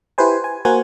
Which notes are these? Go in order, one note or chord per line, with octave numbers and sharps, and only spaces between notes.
E4 G4 B4 C5 G#5
G#5
A#3 F#4 A#4 C5 F#5 G#5